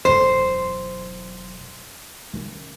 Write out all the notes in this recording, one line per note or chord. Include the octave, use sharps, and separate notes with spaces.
E1 F#2 C5
D#3 C#4